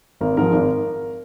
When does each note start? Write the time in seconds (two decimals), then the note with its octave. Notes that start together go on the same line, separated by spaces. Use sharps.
0.21 G#1 A#4
0.37 G#2 F3 A#4
0.53 G#1